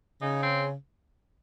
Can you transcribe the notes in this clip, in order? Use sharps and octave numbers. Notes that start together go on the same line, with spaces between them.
C#3 D#4
C4